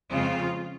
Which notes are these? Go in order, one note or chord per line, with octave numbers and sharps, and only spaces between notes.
F2 C#3 G#3 C4 F4